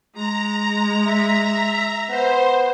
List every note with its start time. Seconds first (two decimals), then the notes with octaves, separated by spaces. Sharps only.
0.14 G#3 A#5
1.05 E5
2.09 B3 C5